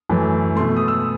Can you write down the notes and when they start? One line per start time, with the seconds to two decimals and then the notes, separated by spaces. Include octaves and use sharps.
0.09 F#2 E3 A3
0.56 A3 C6
0.59 B2
0.76 D#6
0.88 E6